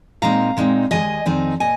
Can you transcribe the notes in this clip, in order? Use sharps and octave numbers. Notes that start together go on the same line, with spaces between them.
A#2 G#3 C4 D#4 F5 A#5
A#2 G#3 C4 D#4
D#2 D#3 G#3 D#5 G#5
F2 D#3 C4 D#4
A#2 D#5 G#5